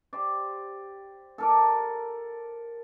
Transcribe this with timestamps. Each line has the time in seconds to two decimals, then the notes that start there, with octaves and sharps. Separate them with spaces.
0.13 G4 C5 D5
1.38 A4 A#4 D5